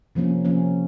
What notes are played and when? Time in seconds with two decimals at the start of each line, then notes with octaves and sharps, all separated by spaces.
0.15 C3 F3 A#3 C#4
0.44 C3 F3 A#3 C#4